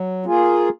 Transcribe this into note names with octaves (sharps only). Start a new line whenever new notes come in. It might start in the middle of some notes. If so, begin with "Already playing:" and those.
Already playing: F#3
A#3 F4 G#4